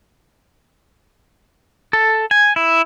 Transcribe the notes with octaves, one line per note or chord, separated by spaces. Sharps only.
A4
G#5
E4